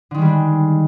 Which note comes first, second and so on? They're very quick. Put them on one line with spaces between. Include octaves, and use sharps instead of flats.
D3 D#3 G#3 G3 D4